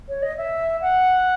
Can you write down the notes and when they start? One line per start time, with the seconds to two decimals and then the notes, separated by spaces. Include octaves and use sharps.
0.09 C#5
0.22 D#5
0.37 E5
0.81 F#5